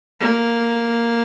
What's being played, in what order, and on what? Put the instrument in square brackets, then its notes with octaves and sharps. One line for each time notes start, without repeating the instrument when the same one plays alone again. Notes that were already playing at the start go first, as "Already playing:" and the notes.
[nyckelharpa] A#3